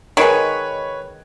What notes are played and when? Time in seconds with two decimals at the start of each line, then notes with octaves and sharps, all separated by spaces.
0.17 D#3 G#3 B4 C#5